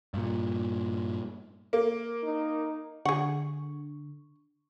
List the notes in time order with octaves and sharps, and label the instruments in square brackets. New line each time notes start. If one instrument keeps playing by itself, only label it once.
[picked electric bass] G2 A#2
[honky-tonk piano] A#3
[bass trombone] D#4
[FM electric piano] D3 [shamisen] G#4 F#5 [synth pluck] C#6